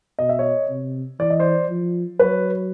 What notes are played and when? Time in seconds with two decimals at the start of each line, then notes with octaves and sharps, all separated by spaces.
0.19 B2 D#5
0.29 E5
0.39 C#5 D#5
0.69 C3
1.20 E3 D5
1.30 D#5
1.40 C5 D5
1.70 F3
2.19 F#3 B4 C#5